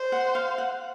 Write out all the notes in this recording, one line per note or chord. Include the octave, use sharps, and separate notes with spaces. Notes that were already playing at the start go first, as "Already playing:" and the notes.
Already playing: C5
F#5
F5
F#5